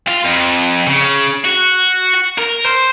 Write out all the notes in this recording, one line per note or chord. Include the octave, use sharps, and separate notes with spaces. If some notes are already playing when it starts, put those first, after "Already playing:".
F4
F2
C#3
F#4
A#4
C5